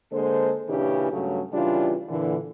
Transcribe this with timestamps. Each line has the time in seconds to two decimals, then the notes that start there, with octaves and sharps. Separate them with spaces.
0.12 D3 G#3 A#3 A4 C5
0.69 A#2 C#3 E3 C#4 D4 G4
1.11 G2 C#3 F#3 A3
1.53 C#3 E3 G3 D4 F4
2.08 A#2 D3 E3